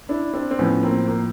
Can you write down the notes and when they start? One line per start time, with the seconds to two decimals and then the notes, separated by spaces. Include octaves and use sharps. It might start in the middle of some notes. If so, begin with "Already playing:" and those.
0.09 D4 E4
0.34 C4 D4
0.51 C4
0.59 A2 F3 B3 C#4
0.83 A#3 C4
1.08 A#3